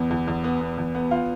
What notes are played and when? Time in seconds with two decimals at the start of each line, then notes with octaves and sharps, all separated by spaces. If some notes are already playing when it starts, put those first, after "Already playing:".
Already playing: E2 B3
0.11 E2
0.27 E2
0.44 B3
0.61 B3
0.78 E2
0.95 B3
1.11 F4